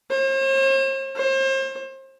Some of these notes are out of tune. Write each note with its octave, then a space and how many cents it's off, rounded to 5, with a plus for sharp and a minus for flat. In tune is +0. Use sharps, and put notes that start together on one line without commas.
C5 +45
C5 +35